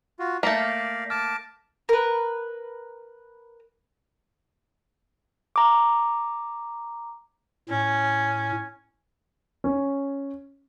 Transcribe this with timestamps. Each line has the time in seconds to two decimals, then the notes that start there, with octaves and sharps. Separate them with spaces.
0.19 F4 F#4
0.43 A3 A#3 D5 F5 G6 A#6 B6
1.10 A5 D6 F6
1.89 A#4 B4
5.56 A#5 D6
7.69 A2 C#4
9.64 C#4